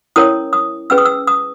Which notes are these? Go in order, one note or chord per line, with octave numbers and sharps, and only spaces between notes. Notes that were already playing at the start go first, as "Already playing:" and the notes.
C#4 E4 A#4 C#5 D#6
D#6
C#4 G#4 B4 E6
D#6
E6
D#6